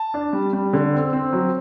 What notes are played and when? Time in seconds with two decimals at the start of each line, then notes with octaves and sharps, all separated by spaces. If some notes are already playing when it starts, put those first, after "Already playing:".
Already playing: A5
0.14 D4
0.33 G3
0.53 G3
0.73 D3
0.93 C4
1.13 C4
1.33 F#3